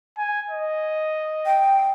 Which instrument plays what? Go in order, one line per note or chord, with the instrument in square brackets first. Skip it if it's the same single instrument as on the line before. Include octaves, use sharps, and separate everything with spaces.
[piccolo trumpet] G#5
D#5
[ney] G5